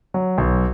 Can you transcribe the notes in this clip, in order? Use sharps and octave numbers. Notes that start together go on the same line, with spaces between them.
F#3
B1